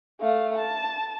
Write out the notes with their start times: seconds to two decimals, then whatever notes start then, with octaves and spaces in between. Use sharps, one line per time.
0.21 A3 F5
0.57 A5